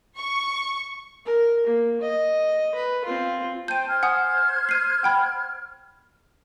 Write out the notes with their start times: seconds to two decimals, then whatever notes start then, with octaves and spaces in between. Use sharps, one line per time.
0.17 C#6
1.26 A#4
1.67 A#3
2.01 D#5
2.75 B4
3.05 C4 F4
3.68 C5 G5 A5 G6 D#7
3.88 C5 F6 G#6
4.03 F#5 G#5 D#6
4.69 C7 D#7
5.03 F#5 G5 B5